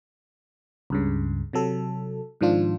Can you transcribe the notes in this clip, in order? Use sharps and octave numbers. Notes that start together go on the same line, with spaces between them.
C#2 G2 C#3
C3 F#3 A4
G#2 D#3 F3 D4 F4